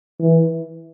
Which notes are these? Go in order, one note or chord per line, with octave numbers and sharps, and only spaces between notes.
E3